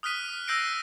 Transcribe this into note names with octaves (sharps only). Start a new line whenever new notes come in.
D#6 F6 F#6 B6 D#7
E6 G6 A#6 C7 D7